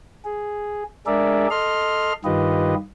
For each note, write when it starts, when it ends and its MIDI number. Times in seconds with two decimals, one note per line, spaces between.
0.25 0.84 68
1.06 1.47 56
1.06 1.47 62
1.06 1.47 68
1.06 1.47 70
1.06 1.47 74
1.06 1.47 76
1.51 2.13 69
1.51 2.13 75
1.51 2.13 84
1.51 2.13 89
2.25 2.75 43
2.25 2.75 51
2.25 2.75 65
2.25 2.75 67
2.25 2.75 71
2.25 2.75 75